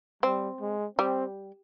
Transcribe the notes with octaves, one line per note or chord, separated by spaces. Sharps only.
G3 C4
G#3
G3 C4